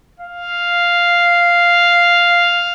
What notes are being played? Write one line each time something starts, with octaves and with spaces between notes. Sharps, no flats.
F5